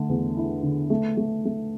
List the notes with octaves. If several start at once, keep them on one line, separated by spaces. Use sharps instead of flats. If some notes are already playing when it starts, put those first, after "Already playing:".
Already playing: D3 A3
E2
E4
D3
A3
A3
A3